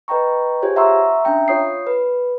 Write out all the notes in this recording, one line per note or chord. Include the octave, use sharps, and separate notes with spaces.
B4 D#5 G5 A#5 C#6
F4 G4 G#4 C5 C#5
E5 F#5 A#5 C6 C#6 E6
C#4 D4 E5 G5 A#5
F4 C#5 D#6 C7
B4